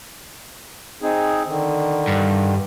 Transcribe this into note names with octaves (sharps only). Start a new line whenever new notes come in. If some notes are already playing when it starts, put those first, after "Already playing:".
C4 D#4 G#4
D3 D#3
G2